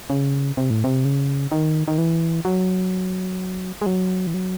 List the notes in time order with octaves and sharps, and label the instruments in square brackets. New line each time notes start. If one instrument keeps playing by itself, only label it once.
[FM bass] C#3
C3
A2
C3
C#3
D#3
D#3
E3
F#3
G#3
F#3
E3
F#3